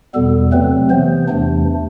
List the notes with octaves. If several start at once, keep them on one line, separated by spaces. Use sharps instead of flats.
E2 B2 G3 B3 A4
C3 F#3 A3 C4 B4
C3 E3 B3 C5
E2 C3 E3 A3 D4